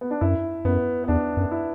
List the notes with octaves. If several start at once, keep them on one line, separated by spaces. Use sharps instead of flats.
B3
D4
F#2 E4
F#2 B3
B3
E2 D4
F#2
E4